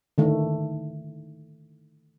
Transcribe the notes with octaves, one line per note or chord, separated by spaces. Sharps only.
D3 D#3 A3